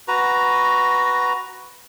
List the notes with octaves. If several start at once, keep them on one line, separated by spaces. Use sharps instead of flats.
F#4 B4 A#5